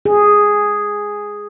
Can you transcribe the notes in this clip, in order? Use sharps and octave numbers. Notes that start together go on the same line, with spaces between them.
G#4